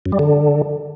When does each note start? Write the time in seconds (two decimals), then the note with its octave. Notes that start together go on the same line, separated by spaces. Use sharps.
0.06 F#2
0.12 G3
0.19 D3